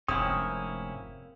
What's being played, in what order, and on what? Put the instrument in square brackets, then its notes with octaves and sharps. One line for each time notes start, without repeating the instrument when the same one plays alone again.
[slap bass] F1 G#2 F3 [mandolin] A#3 C4 [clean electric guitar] C#4 E4 [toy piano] D#6